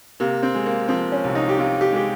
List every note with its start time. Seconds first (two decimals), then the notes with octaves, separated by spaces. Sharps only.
0.20 C3 A#3
0.43 C4
0.54 G#3
0.66 A#3
0.88 F3 C4
1.12 C#4
1.24 C2
1.35 D#4
1.49 G4
1.58 C3 F4
1.81 G4
1.92 G#3 G4